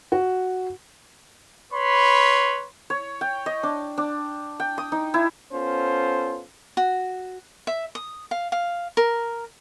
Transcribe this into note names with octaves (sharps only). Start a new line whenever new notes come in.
F#4
B4 C#5 B5 C6
C#5
G5
D#5
D4
D4
G5
D#6
D#4
E4
B3 C#4 F4 A4 C5
F#4
E5
D#6
F5
F5
A#4